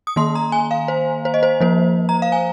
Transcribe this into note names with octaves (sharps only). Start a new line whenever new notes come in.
D#6
D#3 A#3 C6
A#5
G#5
F5
C5
C5
D#5
C5
F3 A#3 C5
A#5
F5
G#5